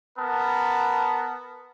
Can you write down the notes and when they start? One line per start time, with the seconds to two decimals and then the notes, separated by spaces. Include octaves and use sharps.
0.18 B3 A#4 A5